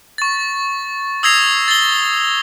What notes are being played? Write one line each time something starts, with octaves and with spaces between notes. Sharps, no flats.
C#6 A6
D#6 E6 G#6 A#6 C7 F7
A6 G7